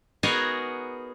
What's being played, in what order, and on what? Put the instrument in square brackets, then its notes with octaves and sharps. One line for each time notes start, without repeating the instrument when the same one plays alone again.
[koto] B3 D#4 F#4 G#4 A#4 C#5